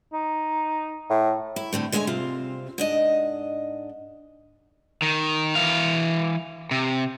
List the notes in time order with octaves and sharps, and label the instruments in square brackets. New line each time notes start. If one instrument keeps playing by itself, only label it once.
[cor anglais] D#4
[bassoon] A2
[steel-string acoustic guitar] E4
A2 D3 C4
D3 G#3 C#5 F5 G#5
C3 C4 F4
G#2 D4 D#5
[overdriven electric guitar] D#3
E3 F5
C3